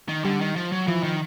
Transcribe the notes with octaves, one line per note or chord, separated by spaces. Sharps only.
D#3
D3 G3
D#3
F3
F#3
E3 F3
D#3